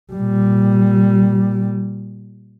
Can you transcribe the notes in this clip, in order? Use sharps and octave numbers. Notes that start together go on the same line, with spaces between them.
A#2 G3